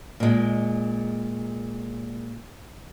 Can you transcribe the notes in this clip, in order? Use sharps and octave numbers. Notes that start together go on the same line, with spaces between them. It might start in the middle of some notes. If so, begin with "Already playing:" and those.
A#2 G#3